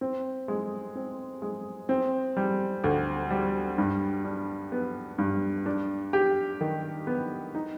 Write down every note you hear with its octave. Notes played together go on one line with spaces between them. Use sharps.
C4
G#3
C4
G#3
C4
G3
D2
G3
G2
D4
B3
G2
D4
G4
D#3
B3
D#4